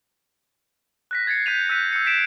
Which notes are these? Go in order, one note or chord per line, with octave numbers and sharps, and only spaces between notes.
F#6 A#6 B6
G#6 A6 C7 C#7
G6 B6 D#7 F7
E6 F#6 G6 B6 D#7
E6 G6 C#7
B6 C7 D7 E7